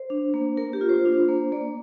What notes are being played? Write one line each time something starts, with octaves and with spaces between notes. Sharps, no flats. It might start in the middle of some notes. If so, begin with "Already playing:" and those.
Already playing: C5
D4
A#3
A#3 A#4
G4
F4
C5
D4
A#3
A#3 D5